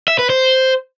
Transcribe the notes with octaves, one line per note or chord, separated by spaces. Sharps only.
E5
B4
C5